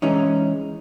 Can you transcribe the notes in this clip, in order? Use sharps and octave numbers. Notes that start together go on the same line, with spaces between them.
E3 G#3 C#4 D#4